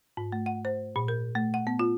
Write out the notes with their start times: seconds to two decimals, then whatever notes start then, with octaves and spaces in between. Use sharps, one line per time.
0.17 G#2
0.32 A3
0.46 F#5
0.65 C5
0.96 A#2
1.08 A#4
1.35 A3
1.54 F#5
1.67 B3
1.79 F4